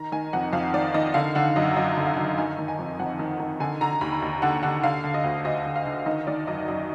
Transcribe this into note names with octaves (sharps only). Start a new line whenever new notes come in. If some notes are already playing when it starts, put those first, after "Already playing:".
Already playing: D#3 A#5
D#3 G#5
F2 F#5
F2 F5
D#3 D5
D#3 D#5
D3 F5
D3 F#5
F#2 D#5
F#2 D#5
D3
F5
D3
D#3 G#5
D#3
G#5
F2
F2 F#5
D#3
D#3
D3 G#5
D3 A#5
D#2 B5
D#2
D3 F#5
D3 F#5
D3 F5
D3
D#5
D2
D2 D#5
D3
F5
D3
D#3 D#5
D#3 D5
F#2 D#5
F#2 D#5